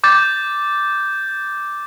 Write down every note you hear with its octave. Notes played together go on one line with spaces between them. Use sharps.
D6 G6 A6